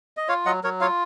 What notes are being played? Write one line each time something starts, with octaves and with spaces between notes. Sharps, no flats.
D#5
F4 C#5 F5
F#3 D#5 F#5
F#3 A#4 C#5
F4 C#5 F5